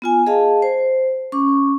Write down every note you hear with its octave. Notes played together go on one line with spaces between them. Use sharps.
B3 F4 G#5
G#4 D#5 F5 A5
C5
C#4 C#6 D6